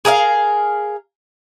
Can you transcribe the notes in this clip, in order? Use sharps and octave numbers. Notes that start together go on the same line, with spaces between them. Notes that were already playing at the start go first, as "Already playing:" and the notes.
G#4 A#4 D#5 F5